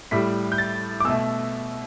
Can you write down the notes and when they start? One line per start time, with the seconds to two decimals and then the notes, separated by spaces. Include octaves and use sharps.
0.11 A2 G3 B6
0.52 G6
0.58 A6
1.00 D6
1.05 B2 A3 E6